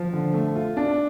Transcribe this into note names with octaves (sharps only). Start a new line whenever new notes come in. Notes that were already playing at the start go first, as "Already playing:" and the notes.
Already playing: F3
D3
A3
F4
D4